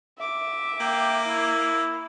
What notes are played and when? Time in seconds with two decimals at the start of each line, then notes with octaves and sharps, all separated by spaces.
0.18 E5 D6
0.80 A#3 G5
1.27 E4